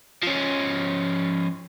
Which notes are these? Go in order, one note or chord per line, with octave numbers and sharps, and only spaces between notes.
F3 C#4